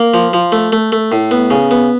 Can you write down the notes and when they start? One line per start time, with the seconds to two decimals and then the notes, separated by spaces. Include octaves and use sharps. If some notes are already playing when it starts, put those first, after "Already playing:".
Already playing: A#3
0.14 F3
0.33 F3
0.52 A3
0.72 A3
0.92 A3
1.12 A2
1.31 B3
1.50 C#3
1.71 B3